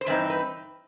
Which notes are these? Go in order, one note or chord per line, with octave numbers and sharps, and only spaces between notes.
C5
G2 E3 C4 D#4 B4
B4